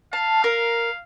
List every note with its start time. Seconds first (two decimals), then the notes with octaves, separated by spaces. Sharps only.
0.13 F5 A5
0.44 A#4 F6